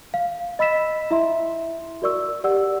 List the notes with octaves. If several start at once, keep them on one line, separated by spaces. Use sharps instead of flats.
F5
D#5 B5 E6 B6 E7
E4 E5 C6
F#4 A#4 D5 C#6 E6
G4 D5 F#5 E6